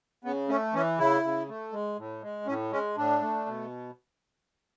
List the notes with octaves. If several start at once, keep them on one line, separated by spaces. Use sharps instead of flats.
C#3 B3
A3 C#4
E3 C#4
C#3 E4
C#3
A3
G#3
A2
G#3
A2 C#4
G#3 C#4
A2 D4
A3
B2